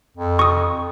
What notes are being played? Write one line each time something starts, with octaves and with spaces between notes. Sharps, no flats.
F2
C#6 D#6